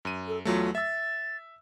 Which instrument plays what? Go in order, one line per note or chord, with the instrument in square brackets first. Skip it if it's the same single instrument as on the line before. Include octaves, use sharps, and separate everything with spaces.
[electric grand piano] F#2 D#7
[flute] A4
[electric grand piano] E2 F#3 A3 [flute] F4
[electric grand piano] E5 E6 [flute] A6